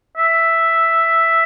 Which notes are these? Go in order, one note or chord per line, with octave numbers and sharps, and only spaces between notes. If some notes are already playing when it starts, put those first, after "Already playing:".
E5